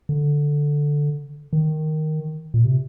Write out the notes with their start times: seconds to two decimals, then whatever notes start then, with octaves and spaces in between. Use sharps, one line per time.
0.09 D3
1.53 D#3
2.54 A#2
2.65 C3